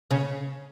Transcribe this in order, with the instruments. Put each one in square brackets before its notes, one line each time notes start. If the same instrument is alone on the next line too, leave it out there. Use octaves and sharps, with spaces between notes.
[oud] C#3 C#4